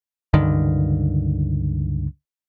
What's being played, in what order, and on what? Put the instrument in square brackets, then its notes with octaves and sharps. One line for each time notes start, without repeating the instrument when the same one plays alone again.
[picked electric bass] C#2 G2 D3 D#3